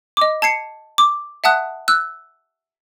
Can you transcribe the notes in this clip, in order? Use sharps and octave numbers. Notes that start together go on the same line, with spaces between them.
D#5 D6
A5 G#6 C7 C#7
D6
E5 F#5 A5 D#6 F#6
E6 F#6